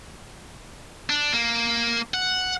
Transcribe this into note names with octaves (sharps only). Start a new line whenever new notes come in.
D4
A#3
F#5